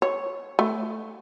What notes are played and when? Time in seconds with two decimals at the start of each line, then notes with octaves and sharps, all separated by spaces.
0.02 C#5
0.59 A3